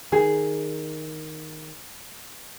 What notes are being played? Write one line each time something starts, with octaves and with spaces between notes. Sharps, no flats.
D#3 G#4